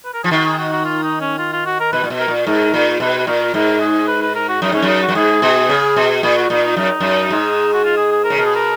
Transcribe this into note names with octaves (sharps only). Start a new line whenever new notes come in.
B4
A#4
F3 G#4
D#3 F#4
G#4
F#4
F#4
F4
D#4
C#4
F4
F4
F#4
A#4
B2 B4
A#2
B2
A#4
A#2
G#2 A#4
A#2
B2 B4
B4
A#2 A#4
G#2 A#4
G#4
B4
B4
A#4
F#4
F#2 D#4
G#2 C#4
F#2
D#4
F#4
F#2
G#2 G#4
B2
C#3
B2
A#2 G#4
F#4
A#2 D#4
D#4
F#2 D#4
F#2
G#2
F#4
F4
G#4
G#4
A#4
C#3
B2 A#4
G#4
A#4